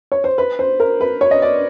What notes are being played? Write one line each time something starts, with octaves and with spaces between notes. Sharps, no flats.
C#5
C5
B4
C5
A#4
B4
C#5
D#5
D5